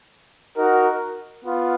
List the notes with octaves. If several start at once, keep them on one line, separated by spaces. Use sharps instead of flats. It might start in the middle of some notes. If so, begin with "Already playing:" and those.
D#4 F#4 A#4
B3 F4